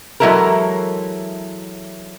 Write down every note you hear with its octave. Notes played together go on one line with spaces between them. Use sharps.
E3 F#3 G#3 E4 A4 A#4